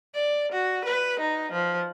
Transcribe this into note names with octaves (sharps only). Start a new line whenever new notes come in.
D5
F#4
B4
D#4
F3